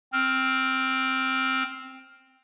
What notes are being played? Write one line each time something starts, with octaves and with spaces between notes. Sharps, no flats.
C4 F6